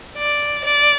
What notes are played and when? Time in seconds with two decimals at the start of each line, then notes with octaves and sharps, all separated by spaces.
0.18 D5
0.65 D5